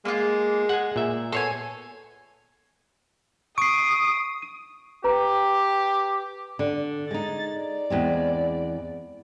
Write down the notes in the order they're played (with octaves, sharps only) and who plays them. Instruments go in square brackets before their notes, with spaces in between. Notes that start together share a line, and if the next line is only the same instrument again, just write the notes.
[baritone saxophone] G#3 [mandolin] A#3 F4
[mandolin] G#4 [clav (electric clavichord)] F#5 G#5
[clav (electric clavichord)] A#2 E5
[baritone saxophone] B3 [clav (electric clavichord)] A4 C#5 [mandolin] G#5 C6
[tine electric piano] C#6 [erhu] D#6 [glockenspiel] C7 D7
[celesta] D#7
[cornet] G4 [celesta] B4 A#5
[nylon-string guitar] D3
[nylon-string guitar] G#3 D#4 [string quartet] A6
[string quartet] D5
[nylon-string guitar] E2 G#3 C4